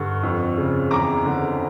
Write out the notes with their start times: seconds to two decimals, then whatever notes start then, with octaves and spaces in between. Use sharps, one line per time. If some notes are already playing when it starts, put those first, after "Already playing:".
Already playing: G2 D3 C#6
0.23 F2
0.57 C#3
0.91 E2 A#5 D6
1.25 D3